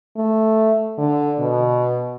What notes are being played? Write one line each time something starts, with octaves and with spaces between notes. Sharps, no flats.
A3
D3
B2